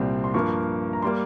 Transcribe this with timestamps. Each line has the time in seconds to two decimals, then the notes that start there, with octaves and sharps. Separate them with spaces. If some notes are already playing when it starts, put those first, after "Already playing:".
Already playing: C2 A#2 G3 C4 C6
0.24 C6
0.34 G2 F3 A#3 C#6
0.93 A#5
1.02 G3 A#3 C6